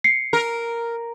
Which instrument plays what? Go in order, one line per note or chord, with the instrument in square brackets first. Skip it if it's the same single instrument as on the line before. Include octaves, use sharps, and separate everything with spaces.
[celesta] C7 C#7
[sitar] A#4